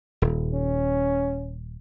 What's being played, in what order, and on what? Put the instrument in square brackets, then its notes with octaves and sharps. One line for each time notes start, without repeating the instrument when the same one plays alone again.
[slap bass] D#1
[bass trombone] C#4